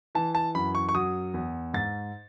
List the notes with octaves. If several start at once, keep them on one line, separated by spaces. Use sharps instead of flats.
E3 A5
A5
F#2 B5
C#6
C#6
F#3 D#6
E2
G#2 A6